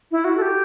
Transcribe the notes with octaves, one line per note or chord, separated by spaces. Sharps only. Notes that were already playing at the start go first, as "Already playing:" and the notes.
E4
F#4
A4
G4